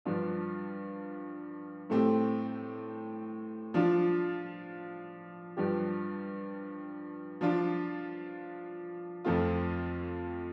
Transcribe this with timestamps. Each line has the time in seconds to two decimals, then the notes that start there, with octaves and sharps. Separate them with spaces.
0.05 G2 F3 D4 F4
1.90 A2 A3 C4 G4
3.74 F3 D4 F4
5.57 G2 F3 D4 G4
7.41 F3 D4 F4
9.24 F2 F3 A3 C4 F4